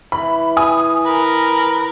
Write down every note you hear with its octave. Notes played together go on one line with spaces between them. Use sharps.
E3 B5
G#5 D#6
A#4 B4